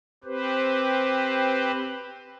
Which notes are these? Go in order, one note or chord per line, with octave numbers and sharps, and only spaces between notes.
C4 G4 B4 C5